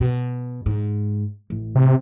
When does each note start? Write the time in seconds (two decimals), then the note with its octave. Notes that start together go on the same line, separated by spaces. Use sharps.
0.01 B2
0.66 G#2
1.50 A1
1.75 C3